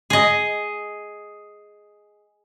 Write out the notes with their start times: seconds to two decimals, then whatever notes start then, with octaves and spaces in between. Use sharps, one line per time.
0.10 G#4 D#5